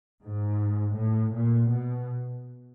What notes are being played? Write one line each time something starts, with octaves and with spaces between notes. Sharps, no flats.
G#2
A2
A#2
B2